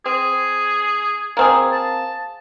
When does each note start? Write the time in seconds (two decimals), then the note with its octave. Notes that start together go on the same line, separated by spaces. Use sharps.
0.06 C4 G#4
1.37 A#3 C4 G#4
1.72 A5